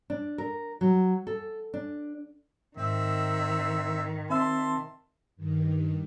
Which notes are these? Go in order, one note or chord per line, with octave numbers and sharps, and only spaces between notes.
D4
A#4
F#3
A4
D4
G#2 D#3 C4 E5
C4 E5 A5 C6 E6
G2 D#3